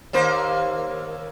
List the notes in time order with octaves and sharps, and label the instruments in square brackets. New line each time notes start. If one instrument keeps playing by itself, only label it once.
[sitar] D#2 A#3 C5